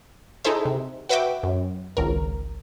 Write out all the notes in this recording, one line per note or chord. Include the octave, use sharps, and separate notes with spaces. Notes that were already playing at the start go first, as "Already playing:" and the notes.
D#4 E4 G#4 A4 C5 E5
C3
F#4 B4 E5 F#5 G5 D6
F#2
G#1 C#2 A#4